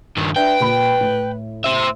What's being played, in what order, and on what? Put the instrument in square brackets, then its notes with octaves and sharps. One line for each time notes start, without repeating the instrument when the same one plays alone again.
[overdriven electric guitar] G2 D#3
[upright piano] D4 E5 [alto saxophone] B4 [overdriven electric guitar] G5
[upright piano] A#2 B5
A2
[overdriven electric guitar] C5 E5